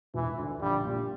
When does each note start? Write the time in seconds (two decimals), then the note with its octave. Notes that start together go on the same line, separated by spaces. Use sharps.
0.14 E1 E3
0.38 D2 D3
0.61 A#1 G3
0.84 A#2 G3